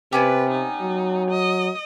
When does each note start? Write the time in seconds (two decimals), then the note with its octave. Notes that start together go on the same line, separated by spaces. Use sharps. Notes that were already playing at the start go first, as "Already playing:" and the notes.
0.13 C3 B3 C#4 G4 B4
0.51 D#4
0.82 F#3
1.31 D#5